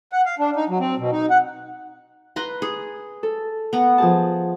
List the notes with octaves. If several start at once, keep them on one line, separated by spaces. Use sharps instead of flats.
F#5
F5
D4
D#4
F#3
C4
B2
D#4
F#5
B4 A#5 C6
G#4
A4
B3 A#5
F3 G#4 A5